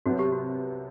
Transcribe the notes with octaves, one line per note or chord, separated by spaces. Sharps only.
C2 C3 F#3 B3 F#4
G4
F#4